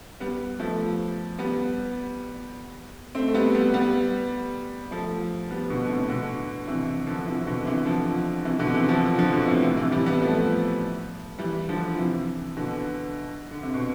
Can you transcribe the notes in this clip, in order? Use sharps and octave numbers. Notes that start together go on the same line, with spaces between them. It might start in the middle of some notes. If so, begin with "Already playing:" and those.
G3 B3
F3 A3
G3 B3
A3 C4
A3
G3 B3
G3 B3
G3 B3
F3 A3
G3 B3
B2 D3
A2 C3
B2 D3
C3 E3
D3 F3
C3 E3
B2 D3
C3 E3
D3 F3
C3 E3
B2 D3
C3 E3
D3 F3
D3 F3
B2 D3
A2 C3
C3 E3
C3 E3
E3 G3
G3 B3
F3 A3
E3 G3
D3 F3
C3 E3
B2 D3
D3
C3
B2